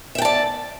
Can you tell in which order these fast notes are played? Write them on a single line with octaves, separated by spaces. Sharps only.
E5 G5 A5 D5